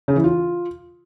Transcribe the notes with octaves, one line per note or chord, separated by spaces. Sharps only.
C#3
E3
F4